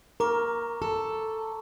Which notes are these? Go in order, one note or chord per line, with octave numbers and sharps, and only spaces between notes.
A#4 A#5 C#6 D6
A4